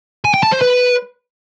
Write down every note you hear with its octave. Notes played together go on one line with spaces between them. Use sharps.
G#5
G5
A5
C5
B4